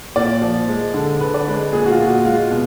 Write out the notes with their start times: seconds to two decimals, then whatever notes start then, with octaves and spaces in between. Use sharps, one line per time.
0.16 A#2 D5
0.42 F3
0.68 G#3
0.94 D3
1.21 D3 B4
1.34 D5
1.47 G#3 B4
1.73 A#2 G#4
1.86 F#4
1.91 F4
1.99 A#2
2.07 F#4
2.25 G#3 F4
2.51 B2